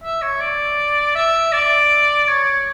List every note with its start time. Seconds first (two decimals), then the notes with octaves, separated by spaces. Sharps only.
0.03 E5
0.22 C#5
0.41 D5
1.15 E5
1.52 D5
2.28 C#5